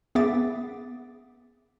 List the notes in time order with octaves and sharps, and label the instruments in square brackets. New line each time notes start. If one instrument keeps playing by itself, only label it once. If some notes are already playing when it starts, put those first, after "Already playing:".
[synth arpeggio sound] B3 G#4 E5 D6 A6 D7